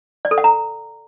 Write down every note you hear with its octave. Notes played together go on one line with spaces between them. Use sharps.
D5
A4
F#5
A#5